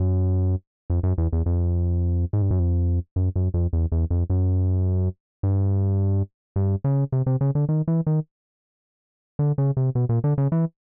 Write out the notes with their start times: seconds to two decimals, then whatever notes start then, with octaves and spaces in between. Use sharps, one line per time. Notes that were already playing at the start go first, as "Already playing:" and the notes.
Already playing: F#2
0.90 F2
1.03 F#2
1.18 E2
1.33 E2
1.46 F2
2.33 G#2
2.42 G2
2.51 F#2
2.60 F2
3.16 F#2
3.36 F#2
3.54 F2
3.73 E2
3.92 E2
4.10 F2
4.30 F#2
5.43 G2
6.56 G2
6.84 C#3
7.12 C3
7.26 C3
7.41 C#3
7.55 D3
7.69 D#3
7.88 E3
8.07 D#3
9.39 D3
9.58 C#3
9.77 C3
9.95 B2
10.09 A#2
10.24 D3
10.38 C#3
10.52 E3